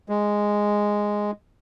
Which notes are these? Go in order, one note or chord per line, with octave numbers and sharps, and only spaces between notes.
G#3